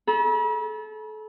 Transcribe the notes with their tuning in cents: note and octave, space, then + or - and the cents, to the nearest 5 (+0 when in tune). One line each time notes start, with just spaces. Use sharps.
A4 -30 B5 -45